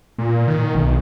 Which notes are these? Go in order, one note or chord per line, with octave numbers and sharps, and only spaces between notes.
A#2
D#3
B1